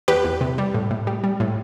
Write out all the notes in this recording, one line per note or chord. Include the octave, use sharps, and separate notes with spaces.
E2 G4 B4
E2
C3
G3
A2
A2
G3
G3
A2